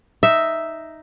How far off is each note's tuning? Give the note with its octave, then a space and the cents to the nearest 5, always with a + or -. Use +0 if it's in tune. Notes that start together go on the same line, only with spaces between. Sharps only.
D#4 +0 E5 +0